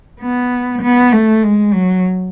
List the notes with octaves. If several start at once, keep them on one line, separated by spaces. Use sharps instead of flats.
B3
B3
A3
G#3
F#3